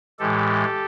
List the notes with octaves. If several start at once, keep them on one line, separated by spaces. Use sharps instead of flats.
A2 E3 G#3 G4 A4